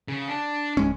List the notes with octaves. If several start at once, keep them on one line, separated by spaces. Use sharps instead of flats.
C#3
D4
D1 G#3 C#4